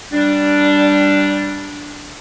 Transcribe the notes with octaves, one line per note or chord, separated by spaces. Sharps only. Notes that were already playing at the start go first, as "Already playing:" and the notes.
G3 D4